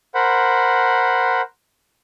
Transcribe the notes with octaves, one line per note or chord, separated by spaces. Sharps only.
A#4 C5 F#5 B5